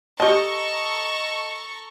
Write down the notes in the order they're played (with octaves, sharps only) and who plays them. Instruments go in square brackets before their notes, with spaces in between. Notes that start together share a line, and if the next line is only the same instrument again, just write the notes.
[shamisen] G4 A5 [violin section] A4 A#5 C#6 [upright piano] D#5 G7